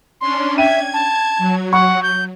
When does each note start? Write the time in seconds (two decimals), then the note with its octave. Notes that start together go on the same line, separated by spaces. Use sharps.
0.21 C#4 D4 C6
0.58 E5 G5 G#6 D#7
0.93 A5
1.38 F#3
1.73 F#5 C#6
2.03 G6